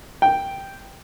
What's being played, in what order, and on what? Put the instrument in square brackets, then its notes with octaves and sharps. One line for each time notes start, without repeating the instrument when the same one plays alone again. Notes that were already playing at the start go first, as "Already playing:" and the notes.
[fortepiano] G5